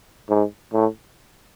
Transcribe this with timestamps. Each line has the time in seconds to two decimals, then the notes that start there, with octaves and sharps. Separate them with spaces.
0.30 G#2
0.73 A2